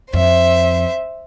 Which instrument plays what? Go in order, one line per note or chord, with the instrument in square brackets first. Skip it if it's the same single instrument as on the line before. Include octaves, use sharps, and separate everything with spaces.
[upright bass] F2 [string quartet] C5 E5